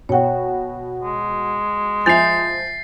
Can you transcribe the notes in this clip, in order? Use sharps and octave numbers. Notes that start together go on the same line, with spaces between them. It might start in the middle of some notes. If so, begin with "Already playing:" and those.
B2 F#4 C#5 G5
G#3
F3 E5 G#5 G6 A6 C7 F7